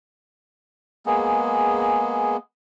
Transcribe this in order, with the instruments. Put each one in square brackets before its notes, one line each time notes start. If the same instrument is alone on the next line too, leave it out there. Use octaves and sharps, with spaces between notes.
[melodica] G#3 A#3 B3 G#4